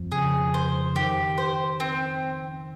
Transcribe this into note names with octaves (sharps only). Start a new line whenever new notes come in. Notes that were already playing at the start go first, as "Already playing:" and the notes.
Already playing: F2 F3
C#3 G#4
C5
D#3 G4
C5
C4